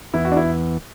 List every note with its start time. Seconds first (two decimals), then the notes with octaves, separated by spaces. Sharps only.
0.14 E2 E3 B3 E4
0.25 F#4
0.32 D4
0.37 E4